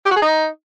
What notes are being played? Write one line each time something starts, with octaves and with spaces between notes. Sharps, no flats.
G4
F#4
G#4
D#4